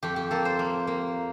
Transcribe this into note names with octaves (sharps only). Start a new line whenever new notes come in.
F2 G4
G4
A#3 A4
C5
A#3
A#3